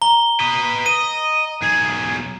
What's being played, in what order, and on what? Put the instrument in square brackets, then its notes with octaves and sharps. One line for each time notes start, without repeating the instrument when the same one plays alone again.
[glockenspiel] A#5 G7
[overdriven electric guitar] B4 D#5
[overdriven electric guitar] D#5 [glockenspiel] D#7
[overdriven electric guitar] B1 G#4